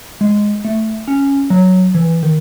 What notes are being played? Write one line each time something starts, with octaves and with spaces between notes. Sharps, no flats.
G#3
A3
C#4
F#3
E3
D#3